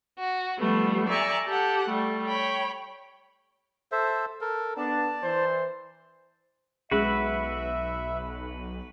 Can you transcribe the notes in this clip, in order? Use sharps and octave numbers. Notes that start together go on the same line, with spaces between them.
F#4
F3 G3 A3 B3
D5 E5 G#5 A#5 C#6
G4 A4 F#5
G3 A3
C#5 G5 B5
A4 C5 E5
A4 A#4
B3 D4 D5 A5
E3 C5
B1 G#3 C#4 F#4 G#4 B4 E5